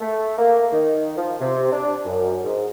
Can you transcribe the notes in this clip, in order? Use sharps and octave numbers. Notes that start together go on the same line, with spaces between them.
A3
A#3
D#3
F3
C3
D4
F#2
G#2